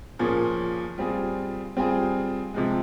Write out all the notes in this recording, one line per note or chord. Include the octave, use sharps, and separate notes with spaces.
A#2 F3 A#3 C#4 G#4
G3 C4 F4 G#4
G3 C4 F4 G#4
C3 F3 G#3